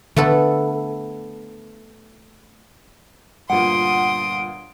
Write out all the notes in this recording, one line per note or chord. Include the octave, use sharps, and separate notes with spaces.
D3 A3 B3 A4
G1 A#2 F#5 C6 D#6 D7